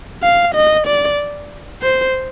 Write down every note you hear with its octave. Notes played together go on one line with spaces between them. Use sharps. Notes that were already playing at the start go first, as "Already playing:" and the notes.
F5
D#5
D5
C5